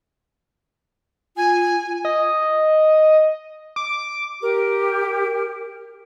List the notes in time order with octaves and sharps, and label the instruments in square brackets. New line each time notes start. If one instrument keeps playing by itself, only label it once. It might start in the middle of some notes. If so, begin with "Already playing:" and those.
[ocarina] F4 [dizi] G#5
[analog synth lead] D#5
D6
[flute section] G4 [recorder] A#4